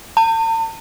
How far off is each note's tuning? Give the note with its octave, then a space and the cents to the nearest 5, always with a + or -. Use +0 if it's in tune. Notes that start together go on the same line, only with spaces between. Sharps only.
A5 +45